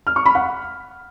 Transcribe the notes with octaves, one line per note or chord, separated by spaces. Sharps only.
F6
C#6
B5
F#5